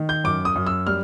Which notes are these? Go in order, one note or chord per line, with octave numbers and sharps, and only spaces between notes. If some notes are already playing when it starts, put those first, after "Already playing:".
Already playing: D#3
G6
F#2 D6
D#6
F#2
E6
G3 F6